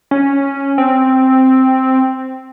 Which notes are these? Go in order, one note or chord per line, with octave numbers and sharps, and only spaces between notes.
C#4
C4